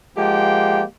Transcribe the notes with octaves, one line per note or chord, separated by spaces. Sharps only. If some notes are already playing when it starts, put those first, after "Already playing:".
F3 G#3 A#3 G4 F#5 G5